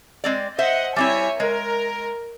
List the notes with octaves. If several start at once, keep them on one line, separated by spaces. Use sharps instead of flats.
G#3 C4 D5
C5 D#5 E5 F#5
G3 C4 E4 C#5 E5 G#5
G#3 A#4